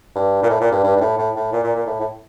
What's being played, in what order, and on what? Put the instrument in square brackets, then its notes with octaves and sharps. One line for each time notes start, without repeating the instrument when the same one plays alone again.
[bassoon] G2
A#2
A2
A#2
G2
G2
G2
A2
A2
A2
A#2
A#2
A#2
A2
A2